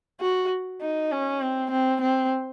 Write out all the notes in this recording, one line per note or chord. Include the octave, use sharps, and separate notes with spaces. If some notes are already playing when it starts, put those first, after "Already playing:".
F#4
D#4
C#4
C4
C4
C4